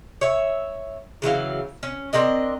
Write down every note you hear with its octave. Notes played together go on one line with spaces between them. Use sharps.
C#5 E5
C#3 E3 F#3 F5
C#4
C4 D4 A#4 D#5